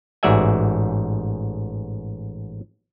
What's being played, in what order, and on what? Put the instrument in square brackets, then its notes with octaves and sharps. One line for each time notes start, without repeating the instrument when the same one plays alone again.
[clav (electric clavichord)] A1 G#2 F#4 D5 E5 G#5